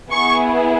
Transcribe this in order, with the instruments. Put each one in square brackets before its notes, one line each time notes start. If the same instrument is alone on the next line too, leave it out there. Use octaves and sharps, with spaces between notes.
[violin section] B3 E4 G#4 C#6